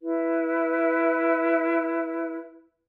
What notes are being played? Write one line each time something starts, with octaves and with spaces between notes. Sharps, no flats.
E4 B4